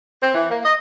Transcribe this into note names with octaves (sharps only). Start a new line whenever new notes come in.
C4
E3
A#3
D#5